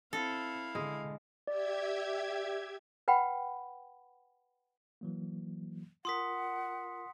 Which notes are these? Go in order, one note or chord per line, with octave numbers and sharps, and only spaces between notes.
C4 E4 A4 F5
D3 G#3
G4 D5 E5 G#6
B4 F#5 G5 B5
E3 F#3 A#3
F4 A#4 F#5 C6 D#6 B6